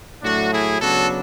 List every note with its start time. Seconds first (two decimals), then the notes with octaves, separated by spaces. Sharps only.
0.22 A2 F#3 A3 D4 F#4
0.51 E4 G#4
0.80 C#3 F#3 B3 D4 F#4 A4